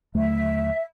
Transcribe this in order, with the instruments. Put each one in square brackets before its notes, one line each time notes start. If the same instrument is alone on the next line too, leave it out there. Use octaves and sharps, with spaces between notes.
[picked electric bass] D#2 D3 F#3 [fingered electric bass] A3 [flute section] E5